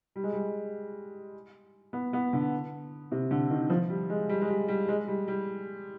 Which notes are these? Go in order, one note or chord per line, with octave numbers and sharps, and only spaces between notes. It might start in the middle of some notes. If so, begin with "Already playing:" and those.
G3
G#3
G3
B3
B3
D3
C3
D3
D#3
F3
G3
G#3
G3
G#3
G3
G3
G#3
G3
G3